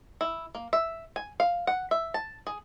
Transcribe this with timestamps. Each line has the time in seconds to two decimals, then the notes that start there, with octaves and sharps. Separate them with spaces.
0.21 E4
0.55 A#3
0.73 E5
1.16 G#5
1.40 F5
1.67 F#5
1.91 E5
2.14 A5
2.47 G#4